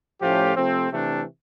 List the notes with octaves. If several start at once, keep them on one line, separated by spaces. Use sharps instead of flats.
A2 F3 A3 C#4 F4 G4
C3 F3 A3 C4
C3 E3 A3 D4